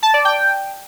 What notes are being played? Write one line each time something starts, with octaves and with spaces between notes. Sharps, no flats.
A5
D5
G5